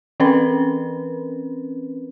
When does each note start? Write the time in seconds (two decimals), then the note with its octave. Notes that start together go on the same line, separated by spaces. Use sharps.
0.20 E3 C4 C#4 A#4 B4